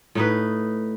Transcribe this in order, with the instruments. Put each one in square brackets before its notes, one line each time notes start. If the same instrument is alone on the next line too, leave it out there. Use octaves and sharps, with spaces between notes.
[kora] A2 D#4 B4